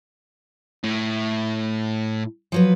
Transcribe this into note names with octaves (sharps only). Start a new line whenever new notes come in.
A2
F3 F#3 B4